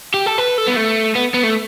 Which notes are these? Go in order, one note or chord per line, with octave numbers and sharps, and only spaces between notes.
G4
A4
B4
A4
B3
A3
B3
B3
A3